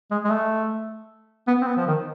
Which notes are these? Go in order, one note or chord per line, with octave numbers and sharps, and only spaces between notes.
G#3
G#3
A3
B3
C4
B3
F3
D#3